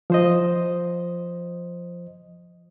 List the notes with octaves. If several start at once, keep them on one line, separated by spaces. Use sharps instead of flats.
F3 C5 D#5